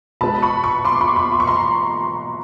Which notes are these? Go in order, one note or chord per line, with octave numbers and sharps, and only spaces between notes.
B2 G#3 B3 A5 B5
B5 C#6
B5 C#6
C6 D6
B5 C#6
B5 C#6
C6
C#6
A#5 C6